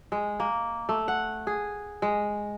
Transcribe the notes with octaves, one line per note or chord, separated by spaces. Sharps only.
G#3
A#3
A3
F#5
G#4
G#3